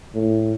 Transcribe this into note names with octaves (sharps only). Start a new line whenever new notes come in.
A2